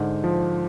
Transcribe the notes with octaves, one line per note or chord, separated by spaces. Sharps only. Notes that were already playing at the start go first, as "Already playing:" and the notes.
Already playing: G#2 D3
F3